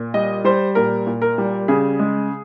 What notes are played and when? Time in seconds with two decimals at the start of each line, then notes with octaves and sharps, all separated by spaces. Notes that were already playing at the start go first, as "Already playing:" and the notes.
Already playing: A#2
0.14 G3 D#5
0.45 G3 C5
0.75 A#2 A#4
1.07 A#2
1.22 A#4
1.38 G3
1.68 C#3 G#4
1.99 G#3